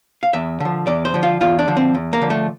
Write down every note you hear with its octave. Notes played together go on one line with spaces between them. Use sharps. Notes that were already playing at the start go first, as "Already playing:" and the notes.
F5
E2 E5
D3 F3
E2 D5
C5
D3 F3
F4
E2 F4
D4
D3 F3
C4
E2
A#3
D3 F3
A3